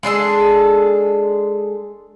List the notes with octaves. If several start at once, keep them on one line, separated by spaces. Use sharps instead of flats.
G#3 D4 G#4 A4